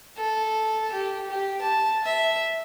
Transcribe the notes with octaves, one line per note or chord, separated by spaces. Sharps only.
A4
G4
G4
A5
E5